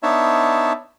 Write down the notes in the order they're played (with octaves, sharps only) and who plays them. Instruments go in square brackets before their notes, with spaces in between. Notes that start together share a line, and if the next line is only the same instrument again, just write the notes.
[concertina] B3 D4 D#4 C#5 E5 A5